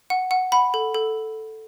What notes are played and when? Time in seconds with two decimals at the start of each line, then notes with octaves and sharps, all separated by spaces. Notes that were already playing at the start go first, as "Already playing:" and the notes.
0.10 F#5
0.31 F#5
0.52 F#5 B5
0.74 A4
0.94 A4